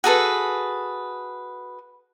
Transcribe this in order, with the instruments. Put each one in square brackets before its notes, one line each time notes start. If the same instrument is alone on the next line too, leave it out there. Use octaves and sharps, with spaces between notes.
[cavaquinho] F#4 G#4 A4 B4